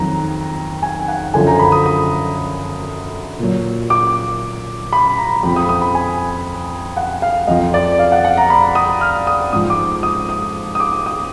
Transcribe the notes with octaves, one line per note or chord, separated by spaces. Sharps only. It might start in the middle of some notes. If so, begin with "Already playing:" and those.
Already playing: F2 D#3 F#3 A#5
G#5
F#5
F#2 D3 F3 G#5
A#5
B5
D#6
D#6
A#2 F#3
D6
B5
A#5
F2 F3 B5
D#6
D#6
B5
G#5
F#5
F5
F2 F3 D#5
D5
F5
F#5
F#5
A#5
B5
D#6
F6
D#6
G#2 F3 D#6
D6
D#6
D#6
D#6
D6
D#6